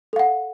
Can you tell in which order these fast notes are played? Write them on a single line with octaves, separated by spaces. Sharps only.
A4 F5 F#5